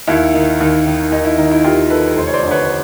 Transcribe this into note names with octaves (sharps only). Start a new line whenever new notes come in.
D#2 E4
D#3
D#2
D#3
D#2 D#4
E4
D#3 D#4
E4
D#2 F4 G4
D#3 A4 B4
F1 C5
C#5
C5 D5
F2 D3
B4 C#5